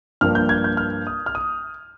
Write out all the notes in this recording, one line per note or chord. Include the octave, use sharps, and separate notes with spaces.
G2 F3 A#3 F6
G6
G#6
G6
F6
D#6
F6
D#6